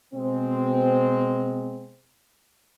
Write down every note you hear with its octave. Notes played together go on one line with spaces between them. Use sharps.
B2 G#3 C4